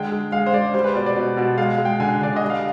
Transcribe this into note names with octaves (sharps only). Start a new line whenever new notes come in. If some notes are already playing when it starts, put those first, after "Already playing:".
Already playing: D3 G#3 G5
G#3
G#3 F5
C5
G#3 D5
G3 C5
B4
B2 D5
D5
B2
B2
G#3 F5
G#3
G5
D3 G#5
D3 D5
D#5
G3
F5